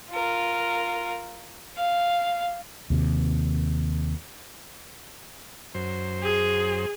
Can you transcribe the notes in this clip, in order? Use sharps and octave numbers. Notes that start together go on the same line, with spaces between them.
F4 A#4
F5
D#2 C3
F#2 C5
G#4